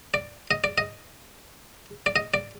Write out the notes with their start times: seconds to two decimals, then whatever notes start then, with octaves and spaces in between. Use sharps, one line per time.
0.14 D5
0.51 D#5
0.64 D5
0.78 D#5
2.06 D5
2.16 D#5
2.34 D5